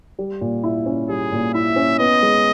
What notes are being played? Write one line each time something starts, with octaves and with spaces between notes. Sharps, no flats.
G3
A#2
E4
C#4
G3 G#4
A#2
E4 E5
C#4
B3 D#5
G#3